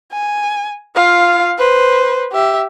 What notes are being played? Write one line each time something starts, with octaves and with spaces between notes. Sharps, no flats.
G#5
F4 F5
B4 C5
G4 E5